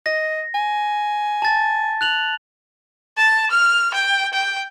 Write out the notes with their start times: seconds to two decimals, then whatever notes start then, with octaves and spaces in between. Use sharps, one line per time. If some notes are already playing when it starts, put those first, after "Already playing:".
0.06 D#5 A#6
0.54 G#5
1.42 A5 A6
2.01 F#6 F7 F#7
3.17 A5
3.51 F6
3.94 G5
4.33 G5